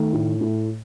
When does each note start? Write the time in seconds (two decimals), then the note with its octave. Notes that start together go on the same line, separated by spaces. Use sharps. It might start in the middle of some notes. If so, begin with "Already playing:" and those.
Already playing: D#3 A3
0.13 A2
0.41 A2